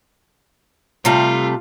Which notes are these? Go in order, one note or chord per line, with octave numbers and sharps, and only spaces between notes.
C3 G3 A3 F4